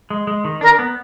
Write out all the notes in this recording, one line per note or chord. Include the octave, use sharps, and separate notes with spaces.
G#3
G#3
D#3
D4 A#4
B3